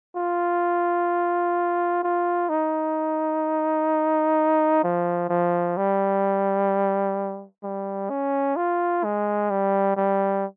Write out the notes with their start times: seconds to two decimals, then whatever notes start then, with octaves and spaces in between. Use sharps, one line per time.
0.16 F4
2.03 F4
2.49 D#4
4.84 F3
5.29 F3
5.77 G3
7.63 G3
8.10 C#4
8.56 F4
9.04 G#3
9.50 G3
9.97 G3